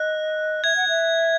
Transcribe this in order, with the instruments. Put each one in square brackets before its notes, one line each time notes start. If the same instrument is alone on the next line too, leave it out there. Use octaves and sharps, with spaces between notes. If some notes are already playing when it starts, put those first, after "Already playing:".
Already playing: [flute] D#5 [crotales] F#6
[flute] E5 [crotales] G#6
[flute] F#5
E5